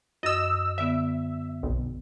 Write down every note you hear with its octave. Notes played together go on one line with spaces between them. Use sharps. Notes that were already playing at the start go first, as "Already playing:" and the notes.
F#2 D#5 E6
D3 B3 E5
B1